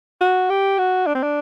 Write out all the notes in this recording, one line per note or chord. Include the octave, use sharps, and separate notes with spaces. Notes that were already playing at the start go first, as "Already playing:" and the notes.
F#4
G4
F#4
D4
C4
D4